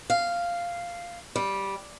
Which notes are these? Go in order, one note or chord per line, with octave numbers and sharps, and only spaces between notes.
F5
G3